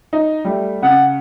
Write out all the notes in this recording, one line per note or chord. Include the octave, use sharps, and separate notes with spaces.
D#4
G3 A3
C#3 F#5